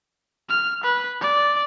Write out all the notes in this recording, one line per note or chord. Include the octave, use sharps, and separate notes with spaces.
F6
B4
D5